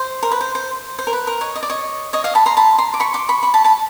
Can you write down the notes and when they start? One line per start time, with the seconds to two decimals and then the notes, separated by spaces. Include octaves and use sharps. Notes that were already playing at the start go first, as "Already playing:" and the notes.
Already playing: C5
0.23 A#4
0.31 B4
0.41 C5
0.55 C5
0.99 C5
1.07 A#4
1.13 B4
1.27 A#4
1.41 C#5 D#5
1.56 D#5
1.63 D5
1.70 C#5 D#5
2.13 C#5 D#5
2.24 D#5 F5
2.35 A5 B5
2.46 A#5 C6
2.57 A5 B5
2.78 A#5 C6
2.94 D6
3.00 B5 C#6
3.14 C6 D6
3.29 B5 C#6
3.43 B5 C#6
3.54 A5 B5
3.64 A5 B5